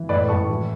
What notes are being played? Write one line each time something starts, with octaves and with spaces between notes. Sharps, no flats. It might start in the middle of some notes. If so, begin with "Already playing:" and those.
Already playing: E3
A2 B4 D5
A2 A5 C#6
E3